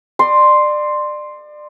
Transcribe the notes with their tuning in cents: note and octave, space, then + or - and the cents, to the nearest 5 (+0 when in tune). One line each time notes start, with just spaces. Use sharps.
D5 +30 C6 +0